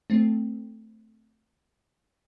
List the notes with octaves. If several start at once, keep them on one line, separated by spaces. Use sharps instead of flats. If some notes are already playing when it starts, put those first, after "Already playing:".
A3 C4